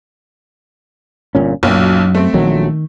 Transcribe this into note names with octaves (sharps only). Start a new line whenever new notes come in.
G1 A#2 C#4
B1 F#2 A#2 F#3
A3 C4
A#1 D#3 F#3